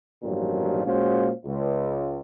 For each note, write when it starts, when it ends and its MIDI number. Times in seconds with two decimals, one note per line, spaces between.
0.23 0.85 33
0.23 0.85 43
0.23 0.85 46
0.23 0.85 51
0.23 0.85 53
0.23 0.85 54
0.85 1.30 46
0.85 1.30 56
0.85 1.30 61
0.85 1.30 66
0.85 1.30 72
0.85 1.30 77
1.45 2.21 37